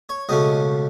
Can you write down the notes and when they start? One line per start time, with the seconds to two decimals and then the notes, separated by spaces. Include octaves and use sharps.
0.09 C#5
0.29 C#2 B2 A3 C#4 D#5